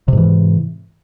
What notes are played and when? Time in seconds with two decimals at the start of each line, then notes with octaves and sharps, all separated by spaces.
0.08 C3
0.13 G#2
0.17 E3